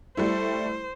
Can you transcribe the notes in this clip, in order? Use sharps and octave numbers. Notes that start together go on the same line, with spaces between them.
G3 A3 E4 C5